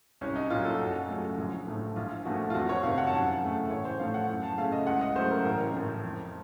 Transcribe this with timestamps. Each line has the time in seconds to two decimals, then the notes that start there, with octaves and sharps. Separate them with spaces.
0.21 C2 C#4
0.36 D#4
0.50 A#2 F#3 F4
0.65 A4
0.79 F#2 F#4
1.09 C#3 F#3 A3
1.38 A#1
1.67 A2 F3 A3
1.96 A#1 F4
2.25 A#2 F3 A3 F#4
2.50 F4
2.55 F2 F#4
2.69 C#5
2.83 C3 D#3 F5
2.98 F#5
3.07 A5
3.13 F#2 F#5
3.41 C#3 A3
3.70 A1 C#5
3.85 C5
3.99 A2 F3 A3 F5
4.14 F#5
4.28 F#2
4.43 A5
4.58 C#3 A3 F5
4.72 D#5
4.87 C#2 F#5
5.01 D#5
5.16 C#3 F#3 A3 C5
5.31 A#4
5.45 A1 A#4
5.74 A2 F3
6.03 F2